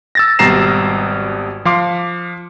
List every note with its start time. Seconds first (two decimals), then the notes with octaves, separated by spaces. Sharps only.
0.15 E6 A6 A#6
0.39 G#1 B2 G3 A#5 C7 E7
1.65 F3 F5 C6 D6